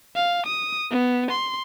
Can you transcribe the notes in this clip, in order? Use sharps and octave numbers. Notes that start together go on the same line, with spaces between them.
F5
D#6
B3
C6